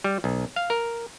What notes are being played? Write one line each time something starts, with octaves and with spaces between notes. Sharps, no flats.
G3
B1
F5
A#4